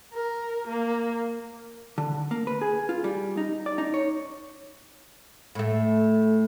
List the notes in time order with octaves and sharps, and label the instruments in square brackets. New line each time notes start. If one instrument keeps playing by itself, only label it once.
[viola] A#4
A#3
[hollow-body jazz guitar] D3
A#3
B4
G#4
F4
G3
D#4
D5
D#4
C#5
[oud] A2 A3